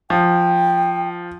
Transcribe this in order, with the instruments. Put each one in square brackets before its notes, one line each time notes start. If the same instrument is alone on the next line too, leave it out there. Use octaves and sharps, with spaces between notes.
[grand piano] F3 [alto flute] G5